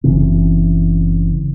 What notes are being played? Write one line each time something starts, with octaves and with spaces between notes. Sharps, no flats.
F#1 C#3 E3 C4